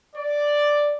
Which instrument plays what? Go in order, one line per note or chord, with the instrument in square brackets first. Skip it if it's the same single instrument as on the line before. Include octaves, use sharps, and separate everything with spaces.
[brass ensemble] D5